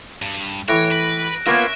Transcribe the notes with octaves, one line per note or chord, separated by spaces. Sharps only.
G2
A2 E3 C#5 F#6 A#6 D7
B4
A#3 B3 C#4 F4 A#4 E5